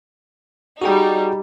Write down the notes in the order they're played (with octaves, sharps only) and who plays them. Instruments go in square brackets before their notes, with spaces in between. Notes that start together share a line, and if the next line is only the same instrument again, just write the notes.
[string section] G3 D#4 [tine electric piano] F#4 G#4 G5